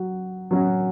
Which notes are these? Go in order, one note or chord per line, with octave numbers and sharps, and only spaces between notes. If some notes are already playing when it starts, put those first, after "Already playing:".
Already playing: F#3 F#4
F#3 C#4 F#4